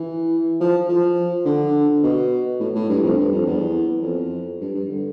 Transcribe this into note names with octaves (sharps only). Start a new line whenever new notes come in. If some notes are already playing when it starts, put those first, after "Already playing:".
Already playing: E3
F3
F3
D3
B2
A2
A2
G2
F2
G2
F2
E2
F2
G2
G2
D3